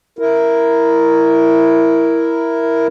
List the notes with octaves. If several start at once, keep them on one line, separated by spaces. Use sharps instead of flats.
E4 A#4